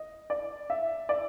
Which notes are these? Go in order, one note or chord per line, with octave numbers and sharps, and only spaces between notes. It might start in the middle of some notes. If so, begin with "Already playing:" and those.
Already playing: D#5
D5
E5
D5